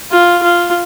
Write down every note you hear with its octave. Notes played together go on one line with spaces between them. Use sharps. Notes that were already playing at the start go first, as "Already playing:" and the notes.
F4
F4